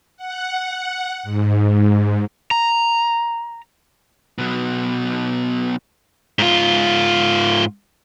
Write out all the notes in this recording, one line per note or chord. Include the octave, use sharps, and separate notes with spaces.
F#5
G#2
A#5
B2 F#3
G#2 F4